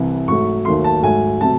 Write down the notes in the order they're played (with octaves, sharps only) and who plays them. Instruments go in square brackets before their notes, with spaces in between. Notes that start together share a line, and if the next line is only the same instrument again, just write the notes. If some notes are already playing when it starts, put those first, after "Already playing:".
Already playing: [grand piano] C2 C3 E3
G#2 F#3 A3 C#6
D#2 D#3 F#3 A3 C6
A5
G#2 F#3 A3 G#5
C3 F#3 A3 A5